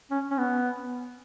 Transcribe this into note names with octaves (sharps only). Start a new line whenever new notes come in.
C#4
C#4
B3